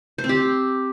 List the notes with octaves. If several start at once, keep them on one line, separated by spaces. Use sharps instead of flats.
C5
C4
G4